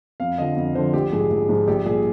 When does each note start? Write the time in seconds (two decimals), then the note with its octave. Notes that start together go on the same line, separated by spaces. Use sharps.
0.20 F2 F5
0.38 D3 F3 D#5
0.56 F2
0.75 D3 F3 C5
0.93 A#1 G4
1.12 G#2 F3 G#3 G#4
1.30 A#1
1.49 G#2 F3 G#3
1.68 A#1 G4
1.86 A#2 G3 G#4